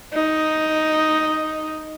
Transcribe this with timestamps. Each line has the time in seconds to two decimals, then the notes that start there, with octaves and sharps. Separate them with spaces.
0.13 D#4